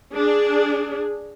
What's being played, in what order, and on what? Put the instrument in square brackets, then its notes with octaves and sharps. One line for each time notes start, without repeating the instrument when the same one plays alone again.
[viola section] D4 G#4